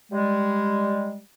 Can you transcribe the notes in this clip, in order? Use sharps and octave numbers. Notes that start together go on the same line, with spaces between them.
G3 G#3